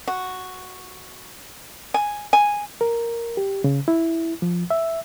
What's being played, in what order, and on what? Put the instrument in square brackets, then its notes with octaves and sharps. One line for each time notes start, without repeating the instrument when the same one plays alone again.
[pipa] F#4
G#5
G#5
[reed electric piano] A#4
G4
C#3
E4
F3
E5